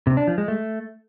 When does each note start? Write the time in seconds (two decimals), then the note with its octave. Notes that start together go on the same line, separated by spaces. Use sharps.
0.07 C3
0.17 D4
0.27 F3
0.38 G#3
0.48 A3